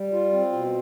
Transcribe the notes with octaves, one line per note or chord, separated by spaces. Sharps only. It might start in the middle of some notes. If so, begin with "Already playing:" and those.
Already playing: G3
F4
C4
B2